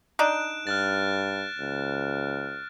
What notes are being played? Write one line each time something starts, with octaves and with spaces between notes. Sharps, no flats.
D4 D#4 F#6 D7 E7
G2 F6 F#6 A6
C#2